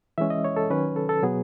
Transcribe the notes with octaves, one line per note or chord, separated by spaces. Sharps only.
E3 G#3 C#4 E5
D#5
C#5
A4
D#3 F#3 C#4 B4
A4
A4
B2 F#3 B3 G#4